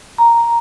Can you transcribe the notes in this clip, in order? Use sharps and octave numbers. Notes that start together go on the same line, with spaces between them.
A#5